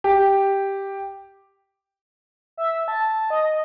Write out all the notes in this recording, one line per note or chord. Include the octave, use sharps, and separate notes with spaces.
G4
E5
A5
D#5